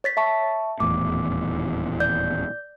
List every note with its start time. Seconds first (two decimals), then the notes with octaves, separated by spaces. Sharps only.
0.04 C#5 A6 B6
0.17 E5 A5 C#6
0.80 D#1 E2 A2 D6
2.00 D5 G6